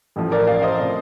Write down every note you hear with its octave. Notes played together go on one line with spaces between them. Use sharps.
A1 A2 F3
A#4 D5
D5 F5
C5 D#5
C3 F3